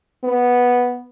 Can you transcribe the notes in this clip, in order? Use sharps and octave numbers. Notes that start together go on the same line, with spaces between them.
B3